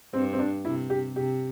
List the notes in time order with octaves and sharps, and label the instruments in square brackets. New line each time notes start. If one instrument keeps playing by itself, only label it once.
[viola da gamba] G2 [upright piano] C4
[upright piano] C4
D4
[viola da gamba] C3 [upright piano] E4
[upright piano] G4
[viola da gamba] C3 [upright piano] G4